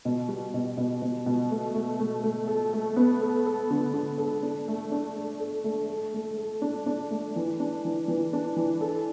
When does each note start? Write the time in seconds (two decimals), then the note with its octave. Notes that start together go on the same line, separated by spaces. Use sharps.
0.05 B2
0.28 G3
0.54 B2
0.77 B2
1.02 B2
1.26 B2
1.51 A3
1.74 A3
1.99 A3
2.23 A3
2.48 A4
2.73 A3
2.96 B3
3.21 A4
3.46 A4
3.70 D3
3.94 D3
4.18 A4
4.43 D4
4.68 A3
4.92 D4
5.17 A4
5.40 A4
5.64 A3
5.89 A4
6.14 A3
6.38 A4
6.62 D4
6.86 D4
7.11 A3
7.36 E3
7.60 D4
7.85 E3
8.08 E3
8.33 D4
8.57 E3
8.81 A4